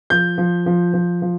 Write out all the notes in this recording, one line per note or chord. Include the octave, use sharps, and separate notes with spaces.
F3 G6
F3
F3
F3
F3